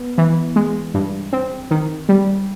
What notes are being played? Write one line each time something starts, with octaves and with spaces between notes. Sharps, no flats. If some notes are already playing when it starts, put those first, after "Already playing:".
Already playing: B3
E3
G#3
G2
C4
D#3
G3